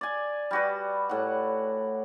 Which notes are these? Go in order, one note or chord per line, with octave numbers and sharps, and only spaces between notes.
D5 G#5
G3 F#4 B4
A2 F#5